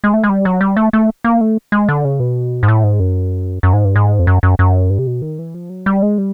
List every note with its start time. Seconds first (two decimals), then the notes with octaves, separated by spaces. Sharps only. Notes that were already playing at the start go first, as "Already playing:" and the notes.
0.04 G#3
0.14 A3
0.24 G#3
0.29 G3
0.45 F#3
0.61 G3
0.77 A3
0.93 A3
1.24 A#3
1.41 A3
1.72 G#3
1.89 D3
2.05 C#3
2.20 B2
2.63 G#2
2.68 A2
2.83 G#2
3.00 F#2
3.63 F#2
3.73 G#2
3.85 G2
3.96 G#2
4.19 F2
4.27 F#2
4.43 F#2
4.59 F#2
4.90 G2
4.98 C3
5.07 B2
5.22 D#3
5.39 E3
5.54 F3
5.70 F#3
5.86 G3
6.02 G#3
6.18 G3